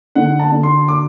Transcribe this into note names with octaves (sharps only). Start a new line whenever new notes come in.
D3 F#5
A5
D3
C6
D6